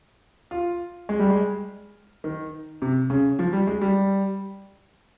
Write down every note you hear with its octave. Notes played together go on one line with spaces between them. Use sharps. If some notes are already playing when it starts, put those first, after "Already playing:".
F4
G#3
G3
G#3
D#3
C3
C#3
F3
G3
G#3
G3